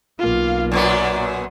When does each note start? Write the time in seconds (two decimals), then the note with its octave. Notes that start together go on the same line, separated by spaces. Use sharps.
0.20 B1 A#3 F4 F5
0.72 F#2 A#2 B3 D5